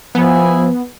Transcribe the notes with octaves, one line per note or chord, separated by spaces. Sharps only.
F3 B3 E4 G#4 G#5